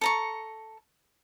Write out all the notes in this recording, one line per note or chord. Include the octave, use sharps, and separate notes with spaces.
A4 A#5 C#6